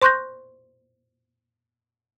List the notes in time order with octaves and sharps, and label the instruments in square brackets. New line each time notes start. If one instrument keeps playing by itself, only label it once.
[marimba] C5 C6 C#6 F#6 G6 A#6